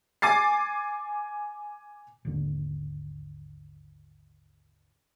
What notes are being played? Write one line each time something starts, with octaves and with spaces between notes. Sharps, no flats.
G#5 D6 A6 C7
G#1 D#2 D3